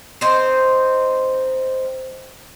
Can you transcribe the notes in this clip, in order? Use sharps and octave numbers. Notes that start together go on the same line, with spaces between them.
C4 D#4 C5